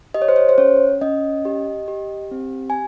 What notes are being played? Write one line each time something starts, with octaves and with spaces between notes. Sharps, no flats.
G4 D#5
C#5
C5
C#5
C5
C#4 C#5
C#4 D#5
G4
G4
C4
G#5